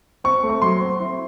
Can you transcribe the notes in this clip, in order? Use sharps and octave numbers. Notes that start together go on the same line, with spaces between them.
C4 C#6
A3
C#6
F#3 C6
C4
E4